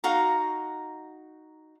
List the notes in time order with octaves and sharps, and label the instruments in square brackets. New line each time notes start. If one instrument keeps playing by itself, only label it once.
[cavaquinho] D#4 F#4 F5 A#5